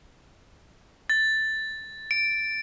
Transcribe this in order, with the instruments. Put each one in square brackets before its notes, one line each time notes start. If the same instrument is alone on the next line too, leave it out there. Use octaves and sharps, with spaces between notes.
[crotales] A6
D7